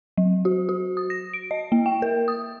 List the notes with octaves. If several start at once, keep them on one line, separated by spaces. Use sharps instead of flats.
F#3
F#4
F#4
D#6
A#6
D7
D#5
A#3
G5
A#4
D#6